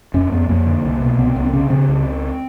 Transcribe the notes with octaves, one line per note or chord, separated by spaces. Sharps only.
F2 C#4
F2 B3
F2 A#3
D3
C2
B2
C2 B3
C4
C2 B3
C4
C#3 C#4
C#3 C4
C#2